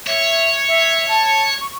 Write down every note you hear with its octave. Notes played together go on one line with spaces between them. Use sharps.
C#5 E5
E5
A5
C#6